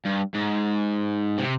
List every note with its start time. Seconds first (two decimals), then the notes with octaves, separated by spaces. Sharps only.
0.05 G2
0.34 G#2
1.38 C3